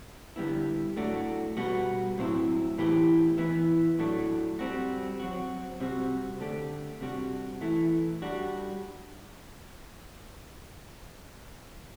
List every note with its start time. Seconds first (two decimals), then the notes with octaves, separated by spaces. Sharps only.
0.36 D3 G3 B3 E4
0.96 A2 F#3 A3 D4 F#4
1.57 B2 G3 B3 F#4
2.17 A2 F#3 C4 E4
2.78 A2 E3 B3 E4 G4
3.38 E3 B3 E4
3.99 A2 F#3 A3 D4
4.59 G3 C4 F#4
5.19 F#3 C4 F#4
5.80 C3 G3 C4 F#4
6.40 D3 A3 D4 G4
7.01 C3 G3 D4 F#4
7.61 E3 A3 E4
8.22 G3 D4 F#4